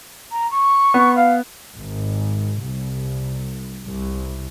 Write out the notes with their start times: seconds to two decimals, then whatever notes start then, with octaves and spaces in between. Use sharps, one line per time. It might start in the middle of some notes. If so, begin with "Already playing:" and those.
0.31 A#5
0.51 C#6
0.94 B3
1.16 F5
1.76 G#1
2.62 C2
3.85 C2